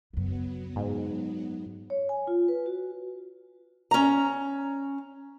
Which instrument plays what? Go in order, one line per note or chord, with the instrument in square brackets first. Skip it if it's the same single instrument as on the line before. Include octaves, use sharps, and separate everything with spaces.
[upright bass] F#2 C#3 [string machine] F#3 B3
[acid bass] G#2
[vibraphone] C#5
G#5
F4
B4
F#4
[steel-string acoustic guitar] C#4 A#5